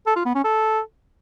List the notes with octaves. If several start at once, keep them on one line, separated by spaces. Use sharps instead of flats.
A4
F4
B3
C#4
A4